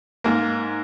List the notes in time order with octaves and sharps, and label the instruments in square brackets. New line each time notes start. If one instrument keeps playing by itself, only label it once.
[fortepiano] G#2 A#3